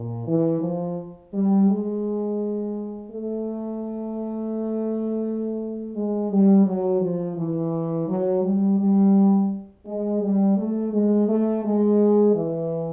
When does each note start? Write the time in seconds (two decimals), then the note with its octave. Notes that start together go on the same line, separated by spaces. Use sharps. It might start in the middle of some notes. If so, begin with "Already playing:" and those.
Already playing: A#2
0.27 E3
0.62 F3
1.33 G3
1.69 G#3
3.10 A3
5.95 G#3
6.31 G3
6.66 F#3
7.01 F3
7.37 E3
8.08 F#3
8.43 G3
8.79 G3
9.86 G#3
10.21 G3
10.58 A3
10.93 G#3
11.28 A3
11.64 G#3
12.34 E3